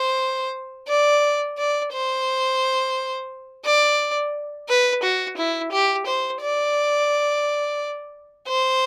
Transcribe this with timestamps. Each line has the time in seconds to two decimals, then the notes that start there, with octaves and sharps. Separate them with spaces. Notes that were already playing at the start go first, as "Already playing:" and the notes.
Already playing: C5
0.88 D5
1.58 D5
1.93 C5
3.65 D5
4.69 B4
5.03 F#4
5.37 E4
5.72 G4
6.06 C5
6.42 D5
8.48 C5